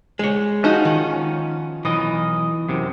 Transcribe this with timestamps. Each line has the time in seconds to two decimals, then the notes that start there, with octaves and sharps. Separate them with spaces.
0.19 G#3 C#5
0.64 F3 C#4 D#4 F#4
0.85 D#3
1.85 B1 E3 D#5
2.69 F#2 C3